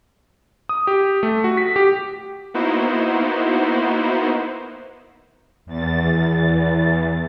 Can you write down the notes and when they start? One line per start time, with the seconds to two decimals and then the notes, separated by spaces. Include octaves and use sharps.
0.69 D#6
0.87 G4
1.23 A3
1.44 F#4
1.57 B6
1.76 G4
2.54 A#3 B3 D#4 E4 F#4 C5
5.66 E2 A6